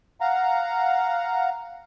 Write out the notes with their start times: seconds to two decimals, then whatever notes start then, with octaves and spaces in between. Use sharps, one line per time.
0.21 F5 F#5 A#5